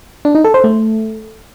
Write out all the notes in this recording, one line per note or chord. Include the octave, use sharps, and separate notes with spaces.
D4
D#4
A4
C5
A3